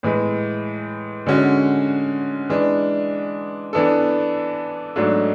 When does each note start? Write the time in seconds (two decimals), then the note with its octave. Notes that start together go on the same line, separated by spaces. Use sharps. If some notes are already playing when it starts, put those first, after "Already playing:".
0.03 A2 E3 G#3
1.26 D3 G#3 C#4 F#4
2.49 E3 G#3 D4
3.73 E3 B3 D4 A4
4.96 G#2 F#3 A3 D4